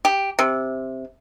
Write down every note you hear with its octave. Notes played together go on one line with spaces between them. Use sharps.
G4
C3